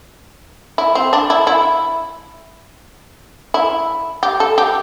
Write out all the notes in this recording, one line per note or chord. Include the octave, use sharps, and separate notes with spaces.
E4
C4
D4
E4
E4
E4
G4
A4
G4